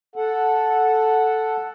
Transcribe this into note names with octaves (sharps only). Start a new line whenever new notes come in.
A4 F#5